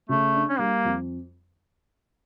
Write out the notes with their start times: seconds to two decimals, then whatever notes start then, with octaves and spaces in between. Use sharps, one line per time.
0.09 C#3 A3
0.34 D4
0.49 C#4
0.59 G3 A#3
0.85 F2